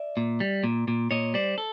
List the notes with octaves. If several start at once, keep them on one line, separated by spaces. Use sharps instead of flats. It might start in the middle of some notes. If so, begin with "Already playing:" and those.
Already playing: D5 E5
A#2
G3
A#2
A#2
A#2 C#5 D#5
G3 C5 D5
A4